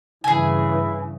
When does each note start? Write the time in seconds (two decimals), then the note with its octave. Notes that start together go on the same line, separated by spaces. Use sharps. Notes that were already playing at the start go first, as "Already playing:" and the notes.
0.24 G2 C#3 E3 E4 G#4 G#5